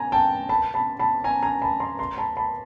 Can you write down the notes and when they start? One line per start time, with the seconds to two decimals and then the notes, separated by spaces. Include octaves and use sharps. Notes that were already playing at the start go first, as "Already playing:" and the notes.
Already playing: G#5 A#5
0.12 G5 A5
0.49 A5 B5
0.74 A5 B5
0.99 A5 B5
1.24 G#5 A#5
1.43 G#5 A#5
1.62 A5 B5
1.80 A#5 C6
1.99 A#5 C6
2.18 A5 B5
2.37 A5 B5